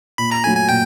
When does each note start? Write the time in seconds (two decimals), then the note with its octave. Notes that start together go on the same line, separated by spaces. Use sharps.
0.18 A#2 B5
0.31 A#5
0.44 F#3 A3 G#5
0.57 G#5
0.69 A#2 G5